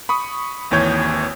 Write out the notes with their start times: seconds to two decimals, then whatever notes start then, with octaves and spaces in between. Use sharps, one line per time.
0.09 B5 C#6 D#6
0.71 G#1 D#2 E3 C#5 G6 G#6